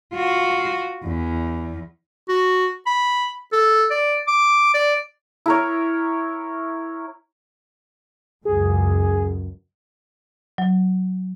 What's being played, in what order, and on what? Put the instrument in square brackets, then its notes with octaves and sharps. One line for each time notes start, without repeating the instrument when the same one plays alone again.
[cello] F4 F#4
E2
[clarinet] F#4
B5
A4
D5
D6
D5
[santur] E4 A#4 C#5
[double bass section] C#2 F#2 [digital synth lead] G#4
[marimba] F#3